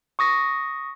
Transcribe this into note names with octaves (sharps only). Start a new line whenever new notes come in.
C#6 D#6 A#6